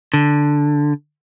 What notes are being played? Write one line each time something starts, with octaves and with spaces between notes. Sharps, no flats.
D3